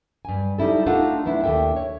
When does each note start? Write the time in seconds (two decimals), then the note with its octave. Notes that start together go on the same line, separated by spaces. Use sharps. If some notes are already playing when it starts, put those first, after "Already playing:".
0.25 G2 G#5
0.58 G3 D#4 E4 A4
0.86 A3 D4 D#4 F4 A4 F#5
1.25 A3 B3 D4 E4
1.44 D#2 D4 A4 E5 G5
1.76 C#5